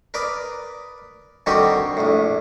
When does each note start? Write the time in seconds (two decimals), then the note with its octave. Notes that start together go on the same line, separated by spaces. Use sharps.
0.14 A#4 B4 D5 D#6
1.46 D3 D#3 G3 C4 F#4 G4
1.97 A#1 A2